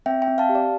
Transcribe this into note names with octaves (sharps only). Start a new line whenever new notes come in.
C4 E5 G5
E5 G5
C4
F5 A5
G4
D5